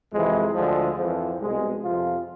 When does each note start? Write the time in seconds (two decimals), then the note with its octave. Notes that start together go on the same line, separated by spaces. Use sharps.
0.13 F2 C3 E3 G#3
0.55 D2 D3 F3 G#3
0.97 F2 E3 F3
1.39 C2 B2 G#3
1.82 F2 C3 F3 F4